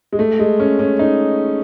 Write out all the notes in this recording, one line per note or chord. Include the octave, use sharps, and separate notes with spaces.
G#3
A3
G#3
C#4
C#4
D#4